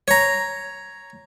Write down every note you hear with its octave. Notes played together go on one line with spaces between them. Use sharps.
C#5 A#5